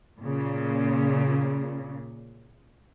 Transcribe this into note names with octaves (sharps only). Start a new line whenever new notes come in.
A#2 C#3